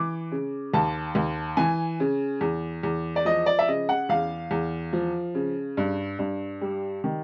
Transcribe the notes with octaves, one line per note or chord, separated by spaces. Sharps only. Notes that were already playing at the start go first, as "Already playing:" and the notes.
Already playing: E3 D6
C#3
D#2 A5
D#2
E3 G#5
C#3
E2
E2
D5
F3 D#5
D5
E5
C#3 D#5
F#5
E2 F5
E2
F3
C#3
G2
G2
G3
D#3